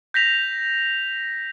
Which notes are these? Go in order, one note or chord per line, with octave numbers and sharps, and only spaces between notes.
G6 A#6 B6 F7